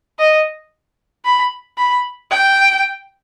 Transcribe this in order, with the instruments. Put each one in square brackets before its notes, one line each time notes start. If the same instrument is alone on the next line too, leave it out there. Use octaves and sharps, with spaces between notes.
[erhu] D#5
B5
B5
G5